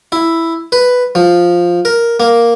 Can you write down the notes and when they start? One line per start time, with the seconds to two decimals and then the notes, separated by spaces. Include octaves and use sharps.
0.12 E4
0.72 B4
1.15 F3
1.85 A#4
2.20 A#3